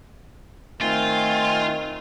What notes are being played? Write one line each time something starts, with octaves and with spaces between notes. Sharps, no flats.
D#3 A3 C4 F4 G#5